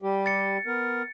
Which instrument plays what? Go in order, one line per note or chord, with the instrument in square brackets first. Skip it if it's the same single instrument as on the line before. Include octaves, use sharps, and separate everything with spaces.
[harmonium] G3 G4
[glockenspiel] A6 C#7
[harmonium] B3 A#4